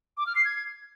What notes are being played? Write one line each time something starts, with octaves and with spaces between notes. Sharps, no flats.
D6
F6
C7
G#6